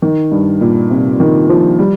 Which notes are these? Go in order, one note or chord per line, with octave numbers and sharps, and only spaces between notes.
D#3
G2
A#2
C3
D#3
F3
G3